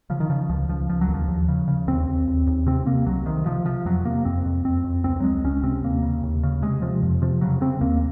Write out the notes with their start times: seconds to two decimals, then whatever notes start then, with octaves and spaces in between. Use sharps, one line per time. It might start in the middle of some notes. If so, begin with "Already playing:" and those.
0.10 C#3 F3
0.20 D#3
0.30 C#3 F3
0.49 C#2 F3
0.69 C#2 F3
0.89 C#2 F3
1.01 F#3
1.08 D#2
1.14 F3
1.28 D#2
1.48 C#3
1.68 C#3
1.87 D#2 C4
2.07 D#2
2.28 D#2
2.47 D#2
2.66 C3 C4
2.86 C3 A#3
3.06 C2 F#3
3.26 C3 D#3
3.46 C3 F3
3.66 C3 F3
3.85 F2 F#3
4.05 C3 A#3
4.25 F2 C4
4.45 F2
4.64 F2 C4
4.84 F2
5.04 C#2 C4
5.20 F#3
5.24 C#2 G#3
5.44 C#2 C#4
5.63 C3 C4
5.84 D#2 A#3
6.03 C#3
6.23 D#2
6.43 C#3
6.62 C3 G#3
6.82 C3 F3
7.03 F2
7.22 C3 F3
7.41 C#3 F#3
7.61 C#3 C4
7.81 D#2 A#3